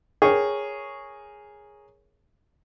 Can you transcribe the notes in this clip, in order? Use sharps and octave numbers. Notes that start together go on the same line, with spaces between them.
G#4 A#4 C#5 G5 C#6